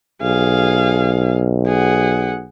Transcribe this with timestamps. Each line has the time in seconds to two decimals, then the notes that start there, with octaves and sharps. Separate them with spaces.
0.22 B1 G#4 F5
1.66 G#4 F#5